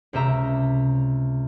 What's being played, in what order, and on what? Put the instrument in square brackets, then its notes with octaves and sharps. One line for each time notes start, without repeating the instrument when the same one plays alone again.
[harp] C#2 C3 G4 E5 A#5